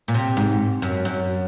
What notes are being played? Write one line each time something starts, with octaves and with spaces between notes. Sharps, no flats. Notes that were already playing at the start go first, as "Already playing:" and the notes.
A#2
C3
G#2
F#2
F#2